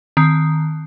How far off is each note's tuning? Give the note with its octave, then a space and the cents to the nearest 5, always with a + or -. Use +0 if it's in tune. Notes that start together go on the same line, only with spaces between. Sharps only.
D#3 +0 C4 +0